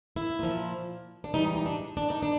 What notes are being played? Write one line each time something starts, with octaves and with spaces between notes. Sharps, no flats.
E4
A#2 F3
D4
G#2 E3 G3 D#4
D#4
D4
D4
D#4
D4